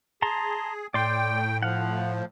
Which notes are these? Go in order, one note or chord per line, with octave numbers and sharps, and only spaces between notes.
G#4 A5 A#5 C6
A2 D5 G5 C6
F3 F5 F#5